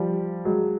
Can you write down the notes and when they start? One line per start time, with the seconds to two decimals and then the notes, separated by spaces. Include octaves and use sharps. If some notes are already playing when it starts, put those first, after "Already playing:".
Already playing: F3 G3
0.45 F#3 G#3